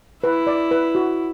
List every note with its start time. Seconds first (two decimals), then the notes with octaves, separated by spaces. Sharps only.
0.23 E4 B4
0.47 D5
0.71 B4
0.95 F#4